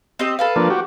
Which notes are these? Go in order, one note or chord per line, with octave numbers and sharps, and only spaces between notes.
C4 G4 D#5
A4 B4 F5
F3 A#3 D4
F#4 G4